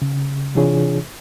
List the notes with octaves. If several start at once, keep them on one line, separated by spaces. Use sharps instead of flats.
C#3
C3 E3 D4 F4 G#4 C#5